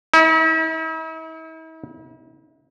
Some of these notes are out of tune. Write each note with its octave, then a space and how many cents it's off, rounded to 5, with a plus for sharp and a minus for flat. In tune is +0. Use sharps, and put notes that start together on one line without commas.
E4 -45